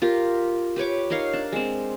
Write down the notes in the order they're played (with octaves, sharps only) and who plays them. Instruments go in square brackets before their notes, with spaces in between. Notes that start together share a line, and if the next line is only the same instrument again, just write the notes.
[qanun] F4 G4 A#4
G4 B4 C#5 D6
D#4 A#4 C#5 F5
D4
G#3 C4